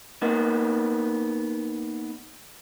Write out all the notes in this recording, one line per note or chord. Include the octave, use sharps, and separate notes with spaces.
A#3 B3 D#4